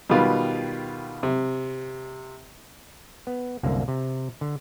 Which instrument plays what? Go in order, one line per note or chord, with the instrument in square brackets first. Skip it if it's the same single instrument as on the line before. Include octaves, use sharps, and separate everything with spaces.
[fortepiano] B2 D#3 G3 F4 B4
C3
[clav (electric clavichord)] B3
C2 F#2 D3 A#3
C3
D3